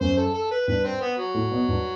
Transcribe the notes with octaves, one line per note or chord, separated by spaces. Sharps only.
F#2 C5
A4
A4
B4
G2 B4
C4
B3
F#3
A2
B2
G2